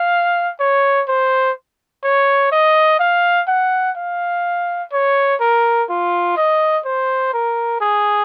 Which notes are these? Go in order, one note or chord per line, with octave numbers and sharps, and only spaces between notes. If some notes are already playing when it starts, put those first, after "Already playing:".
Already playing: F5
C#5
C5
C#5
D#5
F5
F#5
F5
C#5
A#4
F4
D#5
C5
A#4
G#4